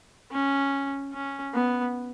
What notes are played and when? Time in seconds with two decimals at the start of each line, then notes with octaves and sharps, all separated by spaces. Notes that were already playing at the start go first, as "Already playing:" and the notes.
0.32 C#4
1.13 C#4
1.54 B3